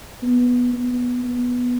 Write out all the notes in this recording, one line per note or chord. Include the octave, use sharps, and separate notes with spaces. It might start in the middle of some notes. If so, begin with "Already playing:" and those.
B3
B3
B3